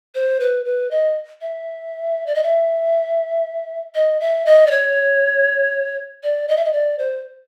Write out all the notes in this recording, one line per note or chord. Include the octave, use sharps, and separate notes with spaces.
C5
B4
B4
D#5
E5
D5
D#5
E5
D#5
E5
D#5
D5
C#5
D5
D#5
E5
D#5
D5
C5